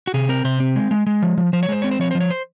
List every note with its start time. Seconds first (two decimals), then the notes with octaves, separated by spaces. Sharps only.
0.07 F#4
0.14 C3 G#4
0.29 C4 A#4
0.44 C3 C5
0.60 C4
0.76 G#3
0.91 G#3
1.07 G#3
1.22 F3
1.38 F3
1.53 F3 C5
1.63 C#5
1.68 G#3 C5
1.82 C4 C#5
1.91 C5
1.99 F3 C#5
2.11 F3 C5
2.20 C#5
2.31 C5